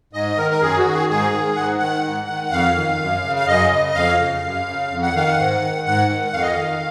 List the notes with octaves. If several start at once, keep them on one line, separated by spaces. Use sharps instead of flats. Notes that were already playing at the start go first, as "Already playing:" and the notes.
G#2 D#5
D#3 A#4
A#4
F#2 G#4
F#4
D#3
G#4
G#2 G#4
D#3
G#2 F#5
D#3 F#5
G#2
D#3
F2 F5
D#3
F#2
C#3
F5
F#2 D#5
C#3
F2 F5
C#3
F#2
C#3
F2
F#5
D#3 F5
F#5
G#2
D#3
G#2 F#5
D#3
F2 F5
D#5
D#3 F5